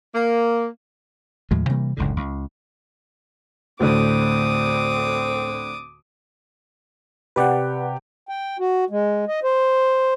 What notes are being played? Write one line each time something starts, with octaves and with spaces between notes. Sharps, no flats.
A#3
D#2 A2 F3 G#3
C3 E3 G3 A#3
F#1 C#2 A2 D3
C#2
D2 A2 D3 C4 D6 D#6
C3 G4 B4 D5 F#5
G5
F#4
G#3
D#5
C5